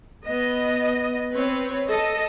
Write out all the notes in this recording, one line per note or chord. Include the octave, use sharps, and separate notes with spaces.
B3 D#5
C4 B4 C#5
A4 D#5